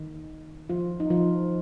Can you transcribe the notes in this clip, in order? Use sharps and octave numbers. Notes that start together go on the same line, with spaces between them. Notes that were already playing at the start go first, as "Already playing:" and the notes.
Already playing: D#3 D#4
F3 F4
D#4
F3 F4